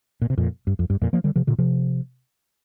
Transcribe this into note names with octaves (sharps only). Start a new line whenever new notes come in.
A#2
C3
F2 A#2
G2
F2
G2
F2 A#2
F3 A#3
D3 G3
C3 F3
A#2 D3
C3 F3